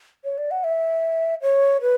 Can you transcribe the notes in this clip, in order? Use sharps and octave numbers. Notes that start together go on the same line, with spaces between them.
C#5
D5
F#5
E5
C#5
B4